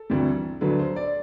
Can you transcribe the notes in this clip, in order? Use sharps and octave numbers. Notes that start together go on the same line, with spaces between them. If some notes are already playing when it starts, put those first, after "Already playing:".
Already playing: A4
D2 C3 E3 G3
D2 D3 F#3 B4
C5
D5